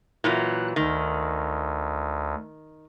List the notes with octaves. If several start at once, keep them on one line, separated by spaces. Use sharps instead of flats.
A#2 E3 F#3 F#6
D2 D#3